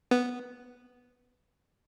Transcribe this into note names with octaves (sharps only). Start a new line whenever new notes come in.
B3